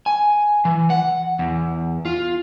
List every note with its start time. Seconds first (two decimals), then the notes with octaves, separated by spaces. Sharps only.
0.06 G#5
0.65 E3
0.90 F#5
1.39 E2
2.05 F4